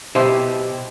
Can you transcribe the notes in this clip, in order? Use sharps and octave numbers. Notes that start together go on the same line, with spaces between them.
B2 E4 G4 C5 D#5